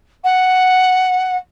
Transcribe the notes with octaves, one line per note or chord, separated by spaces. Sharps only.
F#5